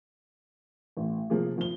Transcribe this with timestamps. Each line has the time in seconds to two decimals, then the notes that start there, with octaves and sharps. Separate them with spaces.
0.97 A1
1.30 C3 F3 A#3 G#4
1.58 F3 G7